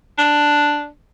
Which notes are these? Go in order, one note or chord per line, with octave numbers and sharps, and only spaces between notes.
D4